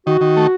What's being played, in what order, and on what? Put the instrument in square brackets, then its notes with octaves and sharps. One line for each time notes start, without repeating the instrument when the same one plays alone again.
[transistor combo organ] D#3 [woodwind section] F#4
[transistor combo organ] D#3
A3